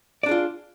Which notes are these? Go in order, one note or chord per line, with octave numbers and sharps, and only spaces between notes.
D4 F4 G#4 D5